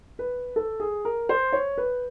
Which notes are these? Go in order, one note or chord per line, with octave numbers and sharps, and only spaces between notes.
B4
A4
G#4
A#4
C5
C#5
B4